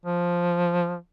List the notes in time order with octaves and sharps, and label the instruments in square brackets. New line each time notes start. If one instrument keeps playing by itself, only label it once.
[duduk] F3